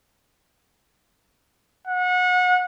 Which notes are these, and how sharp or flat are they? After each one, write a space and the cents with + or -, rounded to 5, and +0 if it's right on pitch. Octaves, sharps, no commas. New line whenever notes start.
F#5 -30